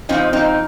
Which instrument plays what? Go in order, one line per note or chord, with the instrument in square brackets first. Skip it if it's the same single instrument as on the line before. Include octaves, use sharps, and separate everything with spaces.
[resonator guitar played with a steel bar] F2 C3 F3 C4 D#4
C4 D#4